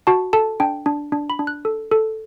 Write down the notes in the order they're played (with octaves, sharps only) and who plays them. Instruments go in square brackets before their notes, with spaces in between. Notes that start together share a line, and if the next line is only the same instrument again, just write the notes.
[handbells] F#4 A5
A4 A5
D4 G5
D4
D4
B5
D4
F#6
A4
A4